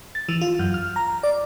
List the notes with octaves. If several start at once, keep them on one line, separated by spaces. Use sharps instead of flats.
A6
E3
F4
F#2
F6
A#5
D5